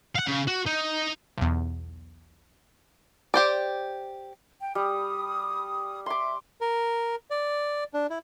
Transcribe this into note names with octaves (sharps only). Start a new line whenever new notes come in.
F5 F#5
C#3
F#4
D#4
B1 E2
G4 C5 D5
G5
G3 D#6
E5 C6 D6
A#4
D5
D4
E4